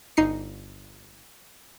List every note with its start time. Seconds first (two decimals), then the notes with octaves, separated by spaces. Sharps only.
0.17 G1 D#4 C7 C#7